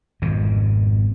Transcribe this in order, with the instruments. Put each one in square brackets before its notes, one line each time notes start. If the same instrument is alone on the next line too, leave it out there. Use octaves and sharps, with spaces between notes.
[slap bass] G#1 F2 B2